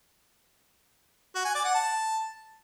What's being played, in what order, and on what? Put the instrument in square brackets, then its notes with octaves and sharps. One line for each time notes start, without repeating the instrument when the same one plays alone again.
[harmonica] F#4
G#5
D5
F#5
A5